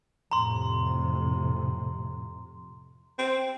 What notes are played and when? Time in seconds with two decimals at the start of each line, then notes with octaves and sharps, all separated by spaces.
0.31 F2 A2 C3 A#5 C6
3.18 C4